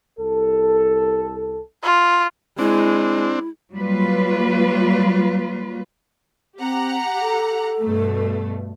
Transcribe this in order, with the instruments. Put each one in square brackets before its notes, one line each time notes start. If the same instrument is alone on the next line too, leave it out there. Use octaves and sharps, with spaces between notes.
[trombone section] C2 A4
[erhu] F4
[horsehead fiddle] G#3 [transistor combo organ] C4 D4 [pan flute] E4
[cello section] F#3 G3 A#3 F4 B4
[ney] C4 [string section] G4 F#5 A#5
[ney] A4
[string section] G2 B2 A3